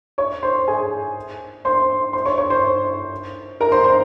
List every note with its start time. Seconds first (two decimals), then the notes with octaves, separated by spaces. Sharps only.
0.18 C#5 C#6
0.43 C5 C6
0.68 G#4 G#5
1.65 C5 C6
2.13 C5 C6
2.26 C#5 C#6
2.38 C#5 C#6
2.50 C5 C6
3.61 A#4 A#5
3.72 C5 C6
3.84 C5 C6